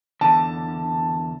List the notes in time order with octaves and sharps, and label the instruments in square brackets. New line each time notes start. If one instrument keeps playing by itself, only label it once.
[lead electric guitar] E2 D3 [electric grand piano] A5